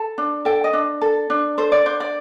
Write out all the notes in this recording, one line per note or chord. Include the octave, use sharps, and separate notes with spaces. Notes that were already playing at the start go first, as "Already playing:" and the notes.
Already playing: A4 A5
D4
A4 G5
D#5
D4
A4
D4
A4 C5
D5
D4 C5
D5